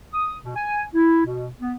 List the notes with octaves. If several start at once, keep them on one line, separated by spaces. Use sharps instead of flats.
D#6
B2
G#5
E4
B2
B3